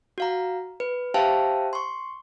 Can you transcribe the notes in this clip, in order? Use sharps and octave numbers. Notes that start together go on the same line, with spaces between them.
F#4 F5 A#5
B4
G4 C5 E5 F5 G5 A5
C6 C#6